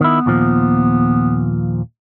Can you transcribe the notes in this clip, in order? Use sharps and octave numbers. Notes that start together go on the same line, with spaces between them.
D#3 B3 E4
D#2 A#2 F3